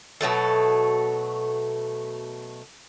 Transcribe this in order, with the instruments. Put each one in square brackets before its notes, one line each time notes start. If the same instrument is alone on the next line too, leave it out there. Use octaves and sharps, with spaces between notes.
[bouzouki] B2 F#3 A3 A4